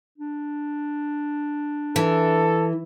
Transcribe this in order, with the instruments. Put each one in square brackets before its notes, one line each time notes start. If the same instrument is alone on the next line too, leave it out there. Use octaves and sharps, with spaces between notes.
[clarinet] D4
[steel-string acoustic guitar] E3 [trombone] A4